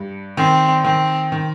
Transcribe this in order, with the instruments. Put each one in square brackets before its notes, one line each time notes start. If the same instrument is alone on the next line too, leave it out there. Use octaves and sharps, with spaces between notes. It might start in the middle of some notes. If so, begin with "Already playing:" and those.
Already playing: [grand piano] G2
[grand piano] D#3 [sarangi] C4
[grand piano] D#3 [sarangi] C4
[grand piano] D#3